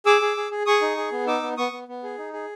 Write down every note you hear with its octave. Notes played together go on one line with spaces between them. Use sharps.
G#4 D6 E6
G#4
G#4
G#4
G#4 C#6 D#6
D#4
G#4
B3
D#4 D6 E6
B3
B3 C#6 D#6
B3
B3
G#4
D#4
G#4